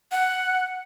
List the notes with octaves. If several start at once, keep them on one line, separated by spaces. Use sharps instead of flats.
F#5